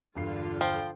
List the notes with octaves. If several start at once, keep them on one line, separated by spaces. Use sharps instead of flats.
E1 G2 D3 F4 C7
F3 G5